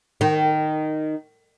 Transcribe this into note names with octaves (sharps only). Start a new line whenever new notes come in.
D#3